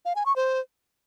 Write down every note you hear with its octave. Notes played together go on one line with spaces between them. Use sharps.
F5
G#5
C#6
C5